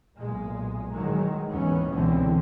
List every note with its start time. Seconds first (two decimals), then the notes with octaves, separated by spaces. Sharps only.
0.17 B1 A#2 G#3
0.94 D#3 E3 F#3 G#3
1.51 D#2 G#2 E3 B3 C#4
1.90 C#2 B2 D3 E3 C4